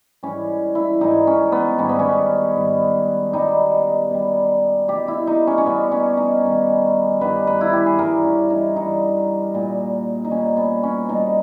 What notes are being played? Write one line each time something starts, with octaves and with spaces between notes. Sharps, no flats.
G#2 E3 G3 C#4
E4
G#2 E3 G3 D#4
C#4
B3
G#2 D#3 G3 C#4
B3
C#4
G#2 D#3 G3
B2 G3 D#4
B2 G3
B2 G3 G4
E4
D#4
C#4
C#4
B2 G3 B3
C#4
D#4
G2 D#3 G3
G2 D#3 G3 B4
B4
E4
G4
G#4
G2 E3 G3 A#4
C#4
D#4
G2 E3 G3 D#4
A#2 G3
D#4
A#2 G3 C#4
B3
C#4
B2 G3 D#4